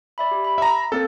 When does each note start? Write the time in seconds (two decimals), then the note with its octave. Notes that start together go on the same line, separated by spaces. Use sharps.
0.18 D5 E5 B5
0.31 G4
0.45 B5
0.58 E5 A#5
0.92 A#3 C4 A4